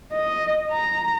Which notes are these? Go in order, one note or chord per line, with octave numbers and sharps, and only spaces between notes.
D#5
A#5